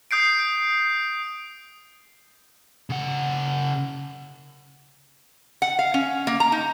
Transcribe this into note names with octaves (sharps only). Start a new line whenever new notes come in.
D#6 G6 C7 D7
C#3 F#5
F#5
F5
C#4
A#3
A#5
D#4